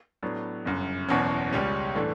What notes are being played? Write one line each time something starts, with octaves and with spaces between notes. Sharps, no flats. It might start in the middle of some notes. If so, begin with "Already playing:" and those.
A2 F#3 B3 D4
G1 F#2 C#3
F#1 E2 B2 F#3 C#4
C#2 C#3 G3 C#4
A2 E3 A3 D4